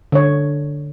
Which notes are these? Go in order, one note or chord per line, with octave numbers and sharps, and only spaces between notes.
D3 D4 C#5